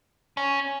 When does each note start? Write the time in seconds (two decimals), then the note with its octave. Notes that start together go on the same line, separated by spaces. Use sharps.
0.37 C#4